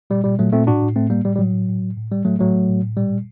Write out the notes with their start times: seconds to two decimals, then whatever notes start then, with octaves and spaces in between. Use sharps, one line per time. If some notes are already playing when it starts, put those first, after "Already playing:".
0.10 A#2 G3
0.24 A#2 G3
0.39 A#2 F#3 A3
0.53 A#2 A3 C4
0.67 A2 D4 F#4
0.82 A2
0.96 A2 A3 C4
1.10 A2 G3 A#3
1.25 A2 G3
1.36 G3
1.39 A2 F#3
1.54 A2
1.68 A2
1.82 A2
1.97 A2
2.10 A2 G3
2.25 A2 F#3 A3
2.39 A2 F#3 A3
2.55 A2
2.69 A2
2.83 A2
2.97 A#2 G3
3.11 A#2